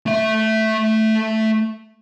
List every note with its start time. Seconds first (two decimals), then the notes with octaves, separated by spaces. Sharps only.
0.06 A3 E5